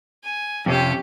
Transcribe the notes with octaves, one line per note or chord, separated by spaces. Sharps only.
G#5
F2 C3 C#4 G4